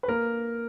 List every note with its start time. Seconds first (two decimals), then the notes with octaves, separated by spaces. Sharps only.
0.03 B4
0.08 A#3 A#4